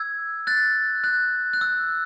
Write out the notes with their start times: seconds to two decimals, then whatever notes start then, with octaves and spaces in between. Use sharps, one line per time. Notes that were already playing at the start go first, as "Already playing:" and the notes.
Already playing: E6 G#6
0.47 F#6 A6
1.04 F#6
1.53 F#6
1.61 E6